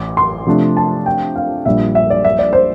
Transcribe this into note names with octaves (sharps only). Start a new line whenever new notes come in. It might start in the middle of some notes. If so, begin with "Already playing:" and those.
Already playing: A1 E3 D6
C6
C3 F3 A3 D4
A5
G5
F5
A#1 A#2 G3 D4 E5
E5
D5
E5
D5
C5